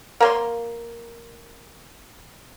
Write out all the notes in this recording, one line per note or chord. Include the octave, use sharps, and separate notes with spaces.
A#3 C#5 C6